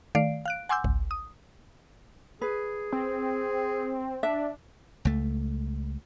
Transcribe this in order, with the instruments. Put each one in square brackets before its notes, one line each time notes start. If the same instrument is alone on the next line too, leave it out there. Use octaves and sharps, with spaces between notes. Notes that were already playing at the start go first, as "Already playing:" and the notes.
[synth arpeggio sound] D#3 A3 D5 F5 C7 D7
F5 F#6 D7
F#5 G#5 C6 D6 E6 G6
G#1 C#2
D#6
[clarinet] G#4 [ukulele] B4
[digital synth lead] C4
[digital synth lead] D4 [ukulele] E5
[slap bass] C#2 A3